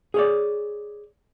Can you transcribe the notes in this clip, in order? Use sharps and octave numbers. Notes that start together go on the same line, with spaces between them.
G#4 C#5 D5